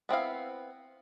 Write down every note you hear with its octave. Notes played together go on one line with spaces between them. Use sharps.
B3 C4 E4 F5